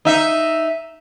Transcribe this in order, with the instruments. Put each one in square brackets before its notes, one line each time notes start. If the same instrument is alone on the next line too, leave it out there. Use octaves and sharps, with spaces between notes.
[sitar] D#4 E5